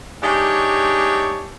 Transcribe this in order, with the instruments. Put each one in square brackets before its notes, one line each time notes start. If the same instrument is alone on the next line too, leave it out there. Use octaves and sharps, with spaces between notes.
[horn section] G#3 D4 D#4 G4 C#5 E5